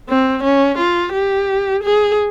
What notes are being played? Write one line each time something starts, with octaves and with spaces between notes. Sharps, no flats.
C4
C#4
F4
G4
G#4